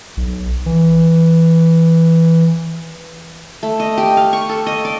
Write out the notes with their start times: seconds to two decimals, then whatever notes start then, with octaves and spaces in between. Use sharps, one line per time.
0.17 B1
0.66 E3
3.63 A3
3.80 D#5
3.98 G4
4.17 F5
4.33 C#6
4.49 A4
4.67 D#5
4.85 D5